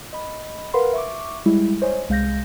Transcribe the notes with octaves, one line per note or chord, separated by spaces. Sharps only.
D#5 B5
A#4 B4 F5 F#5 B5 C6
E5 C#6 D6
G3 G#3 E4
C5 C#5 D#5 G#5
C2 G#3 F5 G6 A#6